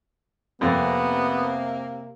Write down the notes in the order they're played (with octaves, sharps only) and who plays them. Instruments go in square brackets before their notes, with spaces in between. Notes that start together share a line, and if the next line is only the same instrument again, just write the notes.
[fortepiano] F2 [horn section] C3 A#3 [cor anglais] B3